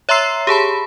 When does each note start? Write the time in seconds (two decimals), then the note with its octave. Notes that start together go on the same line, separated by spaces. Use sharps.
0.09 C#5 E5 A#5 C6 E6 C7
0.47 G4 G#4 A5 B5